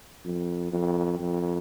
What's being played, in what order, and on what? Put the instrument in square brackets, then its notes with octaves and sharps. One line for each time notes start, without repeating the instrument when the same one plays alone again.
[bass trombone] F2
F2
F2